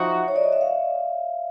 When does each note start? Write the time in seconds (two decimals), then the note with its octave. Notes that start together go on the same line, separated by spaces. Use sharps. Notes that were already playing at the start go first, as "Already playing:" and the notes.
Already playing: F3 D#4 F#4 E5
0.28 C#5
0.36 D5
0.44 D#5
0.53 E5
0.61 F5